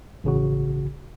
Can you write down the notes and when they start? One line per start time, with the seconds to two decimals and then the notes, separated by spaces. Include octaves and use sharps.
0.24 A1 C#3 F#4